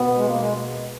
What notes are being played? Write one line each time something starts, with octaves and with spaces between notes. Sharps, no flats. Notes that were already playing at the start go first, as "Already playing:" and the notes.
Already playing: B2 B3
G#3
A#3
G#3